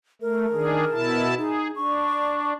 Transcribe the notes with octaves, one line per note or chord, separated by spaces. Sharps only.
A3 A#4
D#3 D4 G#4
B2 E4 A5
D#4 G#4
D4 C#6